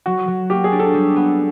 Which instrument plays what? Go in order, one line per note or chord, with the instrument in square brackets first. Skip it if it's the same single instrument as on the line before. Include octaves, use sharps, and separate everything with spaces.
[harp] F#3 [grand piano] F#4
[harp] F#3
[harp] A#3 [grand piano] G4
[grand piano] G#4
[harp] D4
[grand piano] A4
[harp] G3
B3